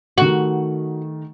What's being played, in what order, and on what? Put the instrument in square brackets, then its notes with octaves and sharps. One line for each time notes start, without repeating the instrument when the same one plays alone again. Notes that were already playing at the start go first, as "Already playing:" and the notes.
[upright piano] D#3 A3 [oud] F#4